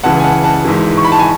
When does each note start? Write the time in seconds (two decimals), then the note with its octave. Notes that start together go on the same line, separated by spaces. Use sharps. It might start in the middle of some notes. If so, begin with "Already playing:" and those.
0.03 C#2 C#3 E3 F#5 A5
0.19 G#5
0.24 F#5 A5
0.44 F#5 A5
0.65 G#1 G#2 E3
0.97 C#6
1.04 B5
1.12 A5
1.19 G#5